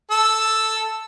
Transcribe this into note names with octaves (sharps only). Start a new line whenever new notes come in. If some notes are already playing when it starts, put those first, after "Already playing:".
A4 E6